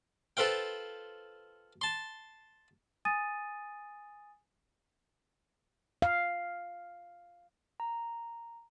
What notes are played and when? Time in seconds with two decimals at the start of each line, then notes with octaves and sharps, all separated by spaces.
0.37 F4 A4 B4 C5 F5 G5
1.81 A5 C6
3.05 G#5 D#6 A6 D#7
6.02 F5
7.80 A#5